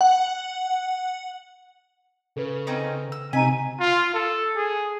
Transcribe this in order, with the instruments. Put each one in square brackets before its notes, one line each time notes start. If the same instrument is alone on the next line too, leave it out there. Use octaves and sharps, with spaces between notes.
[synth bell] F#5
[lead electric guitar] C#3 [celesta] A4 B4
[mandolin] C4 C#4 D#4
E6
[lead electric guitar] C#2 [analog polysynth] C3 D#4 D#7 [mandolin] G#5 [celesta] A#5 B6
[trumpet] F4
A4
G#4